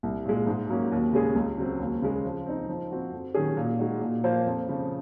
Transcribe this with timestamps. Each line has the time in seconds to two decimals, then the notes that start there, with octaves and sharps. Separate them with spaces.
0.03 C2
0.26 A#2 G#3
0.47 G#2
0.69 F#3 A#3 C#4
0.92 D#2
1.13 C#3 G#3 C#4 G#4
1.35 C#2
1.58 C#3 F#3 C4
1.79 D#2
2.02 C#3 G#3
2.24 F3
2.46 C4 D#4
2.68 F3
2.91 C4 F#4
3.12 F2
3.34 D#3 F#3 C#4 G#4
3.57 A#2
3.79 G#3 D#4 F#4
4.01 A#2
4.24 F3 A#3 F4 C5
4.45 F2
4.68 C#3 F3